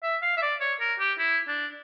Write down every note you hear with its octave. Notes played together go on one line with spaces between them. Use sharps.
E5
F5
E5
D5
C#5
A#4
G4
E4
D4